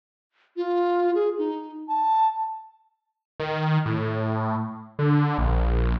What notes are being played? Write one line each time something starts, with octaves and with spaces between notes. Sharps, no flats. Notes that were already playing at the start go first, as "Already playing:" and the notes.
F4
G#4
D#4
A5
D#3
A2
D3
A#1